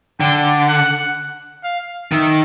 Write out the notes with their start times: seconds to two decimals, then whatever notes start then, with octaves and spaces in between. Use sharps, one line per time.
0.20 D3 G5
0.68 F#5
1.64 F5
2.12 D#3 E5